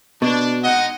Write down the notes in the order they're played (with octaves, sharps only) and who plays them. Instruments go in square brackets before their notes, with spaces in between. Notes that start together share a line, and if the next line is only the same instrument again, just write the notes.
[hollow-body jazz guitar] B2 [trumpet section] D4
[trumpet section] G#3 D#4 D#5 [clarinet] F#5